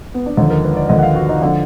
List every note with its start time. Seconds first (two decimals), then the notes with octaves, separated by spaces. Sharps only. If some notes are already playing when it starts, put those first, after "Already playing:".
0.14 B3
0.26 D4
0.37 D#2 D3 F3 D#4
0.50 A#4
0.64 B4
0.77 D5
0.89 D#2 D3 F3 D#5
0.98 F#5
1.03 F5
1.16 F#4
1.29 D#4
1.41 D3 F3 D4